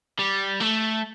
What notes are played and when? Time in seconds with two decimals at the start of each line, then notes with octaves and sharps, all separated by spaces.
0.19 G3
0.60 A3